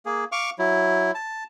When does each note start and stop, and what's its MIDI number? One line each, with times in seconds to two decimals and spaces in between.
0.06 0.25 58
0.06 0.25 68
0.32 0.50 77
0.32 0.50 85
0.32 0.50 86
0.32 0.50 89
0.59 1.12 54
0.59 1.12 64
1.15 1.44 81